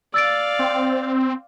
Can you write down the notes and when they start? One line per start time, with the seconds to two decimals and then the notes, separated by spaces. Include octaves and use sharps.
0.14 D5 F5 E6 A6 D7
0.59 C4